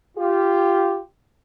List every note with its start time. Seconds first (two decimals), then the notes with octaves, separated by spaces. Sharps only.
0.17 F4 G4